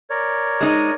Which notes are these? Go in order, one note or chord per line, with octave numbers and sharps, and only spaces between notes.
A#4 C#5 D5
G#3 D#4